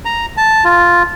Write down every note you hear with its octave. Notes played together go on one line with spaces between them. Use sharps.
A#5
A5
F4